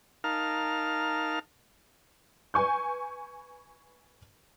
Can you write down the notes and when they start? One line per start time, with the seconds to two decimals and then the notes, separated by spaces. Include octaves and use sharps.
0.24 D#4 A#4 F5 A5 F6
2.54 B4 G#5 C#6 G6